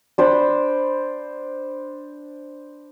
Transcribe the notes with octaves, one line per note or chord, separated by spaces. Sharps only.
D4 C5 D5 B5